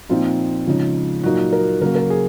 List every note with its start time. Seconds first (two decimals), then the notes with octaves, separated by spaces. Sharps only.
0.09 A#2 F3 C4 D#4 F4
0.67 C#3 F3 G#3 D#4
1.23 A#2 F#3 A#3 D#4 F#4
1.53 A#4
1.81 C#3 F#3 A#3 A#4
1.95 A#4
2.10 G#4